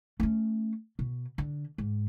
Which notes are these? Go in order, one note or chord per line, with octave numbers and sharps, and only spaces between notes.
A3 C#4
B2
D3
G#2